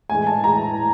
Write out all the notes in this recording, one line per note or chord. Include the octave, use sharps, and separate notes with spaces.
A2 E3 G#3 G#5
A5
A2 E3 G#3 A#5